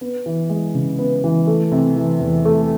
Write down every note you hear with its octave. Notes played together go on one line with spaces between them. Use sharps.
B3
E3
G#3
C#3
B3
E3
A3
C3
E3
E2
A3